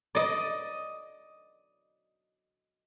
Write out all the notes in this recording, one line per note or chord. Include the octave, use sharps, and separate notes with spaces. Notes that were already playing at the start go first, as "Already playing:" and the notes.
D5 D#5